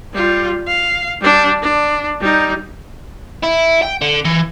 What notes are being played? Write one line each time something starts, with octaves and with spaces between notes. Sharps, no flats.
G3 F4
F5
G3 D4
D4
G3 D#4
E4
G5
D3
E3